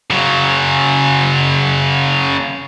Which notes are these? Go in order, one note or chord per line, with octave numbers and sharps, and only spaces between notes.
C#3 F#3